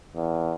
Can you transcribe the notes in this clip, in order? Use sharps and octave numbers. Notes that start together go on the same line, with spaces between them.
E2